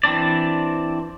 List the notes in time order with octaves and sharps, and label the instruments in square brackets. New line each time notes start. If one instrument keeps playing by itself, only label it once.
[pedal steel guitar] E3 C4 D4 D5